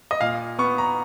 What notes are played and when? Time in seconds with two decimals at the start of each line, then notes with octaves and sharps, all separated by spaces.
0.11 D#5
0.21 A#2 F5
0.58 B3 C#6
0.78 A#5